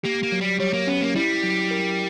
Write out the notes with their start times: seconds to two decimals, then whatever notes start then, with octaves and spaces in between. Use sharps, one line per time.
0.04 A#3 G4
0.23 A#3
0.32 F#3
0.41 G3
0.60 G3 C#5
0.74 A#3
0.87 B3 C#4
1.01 A#3
1.15 G3 E4
1.43 F#3
1.71 A#4